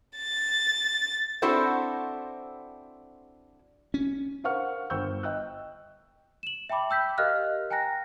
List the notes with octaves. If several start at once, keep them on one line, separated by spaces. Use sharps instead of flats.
A6
C4 D4 E4 F#4 A4 C5
C#4
A#4 C5 F5 F#5 C#6 F6
G1 C5 G5 C#6 E6 G6
D#5 G5 E6 F#6
E7 F#7
E5 G5 A5 B5 D6
G5 E6 G6 B6
G4 A#4 D#5 F5 F6 F#6
G5 G#5 A#5 F#6 A#6